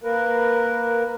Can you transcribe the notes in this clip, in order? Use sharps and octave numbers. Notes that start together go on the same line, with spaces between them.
A#3 A#4 B4